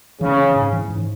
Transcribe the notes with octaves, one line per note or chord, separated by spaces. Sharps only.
C#3 E3
C#4
G#2
E3
G#2